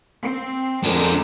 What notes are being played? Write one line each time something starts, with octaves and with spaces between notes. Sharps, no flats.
C4
F2 D3 G#3 D4 A#4